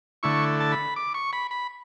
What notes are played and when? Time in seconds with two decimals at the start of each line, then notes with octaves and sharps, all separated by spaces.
0.23 D3 A3 E4 C#6
0.60 A5
0.72 B5
0.96 D6
1.14 C#6
1.33 B5
1.51 B5